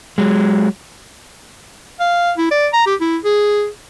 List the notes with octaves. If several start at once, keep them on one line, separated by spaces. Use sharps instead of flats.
F#3 G#3
F5
E4
D5
A#5
G4
E4
G#4